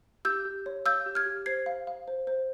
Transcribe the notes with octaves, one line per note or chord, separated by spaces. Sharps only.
G4 E6 G6
G4
C#5
F5 E6 G6
G4
F6 G#6
G4
C5 G#6 C7
F5
F5
C5
C5